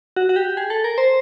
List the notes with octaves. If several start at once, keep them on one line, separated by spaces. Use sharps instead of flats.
F#4
F#4
G4
G#4
A4
A#4
C5